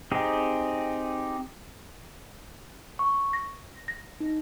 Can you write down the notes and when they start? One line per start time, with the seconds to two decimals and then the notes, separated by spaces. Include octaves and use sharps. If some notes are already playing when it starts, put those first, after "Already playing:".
0.11 C4 D#4 G4 G#4
2.99 C#6
3.33 A#6
3.88 A#6
4.20 D#4